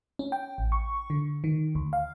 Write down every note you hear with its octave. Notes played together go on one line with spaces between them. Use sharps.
C#4
G5
A1
C#6
D3
D#3
D2
F5